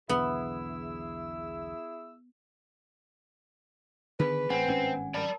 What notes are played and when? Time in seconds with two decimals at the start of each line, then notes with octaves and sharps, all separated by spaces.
0.09 B1 E2 D3 B3 E4 G#4 E6
4.19 D3 D#3 B3 G#4 B4 B5 B6
4.50 A1 C4 F#5 G#5
4.68 G#1 G2 C#4
5.14 A#4 D5 A5 B5